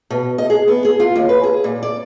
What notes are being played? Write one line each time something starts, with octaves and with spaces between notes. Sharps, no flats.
B2
D#5
G#4
B3
G#4
F4
D#2
B4
G#4
A#2
D5